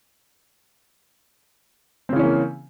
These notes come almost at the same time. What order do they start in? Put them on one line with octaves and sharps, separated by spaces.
C4 C#3 E3 C#4 A#3